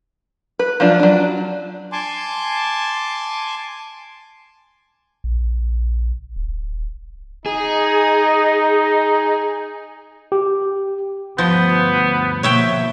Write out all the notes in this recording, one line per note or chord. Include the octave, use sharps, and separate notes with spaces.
B4
F3 F#3 D4 F4
F#3 D4
G#5 A5 C6 D6
A#1
D1
D#4 G#4
G4
D2 G2 F3 B3 G6
B2 F3 A#3 C#5 E5 G5